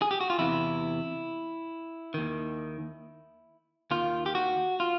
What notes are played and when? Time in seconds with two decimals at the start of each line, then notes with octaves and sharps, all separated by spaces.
0.02 G#4
0.11 G4
0.21 F#4
0.30 F4
0.38 E2 C3 E3 E4
2.14 D#2 D#3
3.91 D#2 D#3 F4
4.26 G4
4.35 F#4
4.80 F4